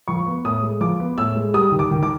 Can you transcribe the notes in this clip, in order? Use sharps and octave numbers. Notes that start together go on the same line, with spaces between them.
F3 C#6
B3
A2 D#6
G#3
F3 D6
B3
A2 E6
G#3
G3 D#6
D#3
D6
D#3
D6